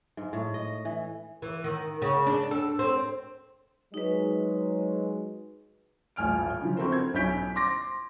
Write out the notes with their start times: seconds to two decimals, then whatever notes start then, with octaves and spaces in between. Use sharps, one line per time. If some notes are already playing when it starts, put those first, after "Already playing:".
0.17 G#2
0.33 A2
0.54 D#5
0.85 E3
1.42 E3
1.64 D#3
2.02 C#3
2.26 D4
2.51 A4
2.79 C4
3.94 F#3 G#3 D#4 B4
6.16 D#1 A1 G#5 F6 D7
6.61 C#3 F3
6.77 C4 E4 F#4 A4 A#4 C5
6.92 G#6
7.14 B1 C#4 E4 G6 B6 D7
7.56 C6 D6 A#6